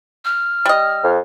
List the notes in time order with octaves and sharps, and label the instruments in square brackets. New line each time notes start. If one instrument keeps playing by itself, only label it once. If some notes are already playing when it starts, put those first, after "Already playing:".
[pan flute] F6
[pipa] G3 D#5
[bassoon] F2